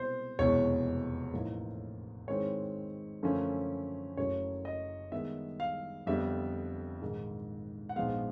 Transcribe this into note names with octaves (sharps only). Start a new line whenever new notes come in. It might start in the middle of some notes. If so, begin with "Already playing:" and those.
Already playing: C2 B2 G#3 C4 C5
F1 E2 B2 G#3 C#5
A1 A2 F3 A#3 D#4
G#2 D#3 G#3 C4 E4 C#5
F#2 D3 F3 A3 C#4
F#1 F#2 C#3 F#3 A3 C#5
D#5
G2 D#3 G#3 B3 E5
F5
F2 D3 G3 B3 E5
A#1 G#2 D#3 G#3
F#5
A#1 G#2 F3 G#3 B3 F5